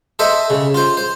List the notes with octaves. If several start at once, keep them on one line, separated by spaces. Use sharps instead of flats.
A4 C5 D#5 E5
C#3
F4 C5
C5